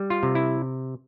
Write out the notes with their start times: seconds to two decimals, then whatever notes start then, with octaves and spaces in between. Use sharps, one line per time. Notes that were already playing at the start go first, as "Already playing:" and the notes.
Already playing: G3
0.10 F4
0.23 C3
0.35 E4